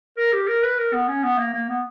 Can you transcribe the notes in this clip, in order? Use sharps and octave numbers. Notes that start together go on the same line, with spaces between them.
A#4
G4
A#4
B4
A#4
B3
C#4
B3
A#3
A#3
B3